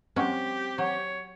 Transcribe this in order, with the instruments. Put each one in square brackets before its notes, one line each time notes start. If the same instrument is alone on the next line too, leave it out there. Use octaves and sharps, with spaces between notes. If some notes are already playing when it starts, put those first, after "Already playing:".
[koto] F#3 G#3 C#4 [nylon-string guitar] C4 [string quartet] G4
[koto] F#3 [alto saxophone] C#5